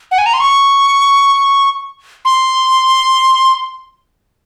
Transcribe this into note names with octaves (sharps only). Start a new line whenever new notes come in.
F#5
G#5
A#5
C6
C#6
C6